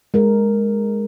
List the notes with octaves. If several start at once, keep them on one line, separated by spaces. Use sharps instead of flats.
G#3 A#4